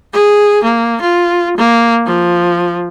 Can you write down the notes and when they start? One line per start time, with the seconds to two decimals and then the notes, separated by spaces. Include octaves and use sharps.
0.13 G#4
0.63 A#3
1.01 F4
1.57 A#3
2.06 F3